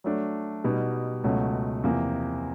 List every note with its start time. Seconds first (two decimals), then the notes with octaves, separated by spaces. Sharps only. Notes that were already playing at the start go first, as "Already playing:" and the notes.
0.04 F#3 A3 D4
0.64 B2 G3 B3 D#4
1.24 C#2 B2 F#3 A3
1.83 E2 C3 F3 A#3